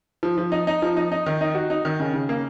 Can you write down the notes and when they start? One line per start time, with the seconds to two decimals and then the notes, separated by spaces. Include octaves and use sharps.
0.23 F3
0.38 F3
0.52 D#4
0.67 D#4
0.82 F3
0.97 D#4
1.12 D#4
1.26 D#3
1.41 D#4
1.55 F#4
1.70 D#4
1.85 D#3
2.00 C#3
2.13 C#3
2.29 A#3